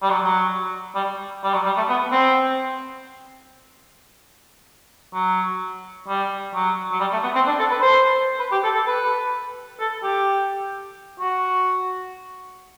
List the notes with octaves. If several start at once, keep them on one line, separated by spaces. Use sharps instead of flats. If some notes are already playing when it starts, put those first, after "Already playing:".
G3
F#3
F#3
G3
G3
F#3
G3
A3
B3
C4
F#3
G3
F#3
F#3
G3
A3
B3
C4
D4
A4
B4
C5
B4
G4
A4
A4
B4
A4
G4
F#4